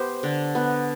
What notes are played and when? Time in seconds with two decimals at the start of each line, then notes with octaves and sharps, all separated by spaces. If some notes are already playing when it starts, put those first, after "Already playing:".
Already playing: B3 G4 C5
0.23 D3
0.55 B3